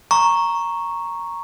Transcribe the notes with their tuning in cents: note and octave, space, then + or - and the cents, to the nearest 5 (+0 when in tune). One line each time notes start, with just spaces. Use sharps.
A#5 +0 C#6 -5